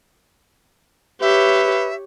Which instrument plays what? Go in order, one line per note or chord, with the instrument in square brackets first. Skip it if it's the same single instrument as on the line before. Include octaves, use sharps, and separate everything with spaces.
[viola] G4 C#5 [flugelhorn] B4 [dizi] E5